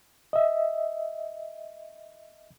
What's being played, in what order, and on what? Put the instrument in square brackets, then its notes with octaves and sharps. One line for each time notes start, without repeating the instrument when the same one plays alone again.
[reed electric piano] D#5 E5